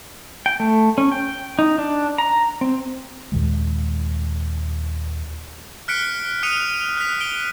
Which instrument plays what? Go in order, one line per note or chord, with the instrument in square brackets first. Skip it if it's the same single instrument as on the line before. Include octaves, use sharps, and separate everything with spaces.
[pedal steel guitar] G5
A3
C#4
G5
D#4
D4
A#5
C4
[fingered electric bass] D#2 A#2 D#3 G#3
[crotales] F6 F#6 B6 C#7 D7 G7
D#6 F6 F#6 C#7 D#7 F7
D#7
F#6 B6
D7 G7